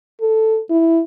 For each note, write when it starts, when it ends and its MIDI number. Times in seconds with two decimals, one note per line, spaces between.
0.21 0.60 69
0.70 1.01 64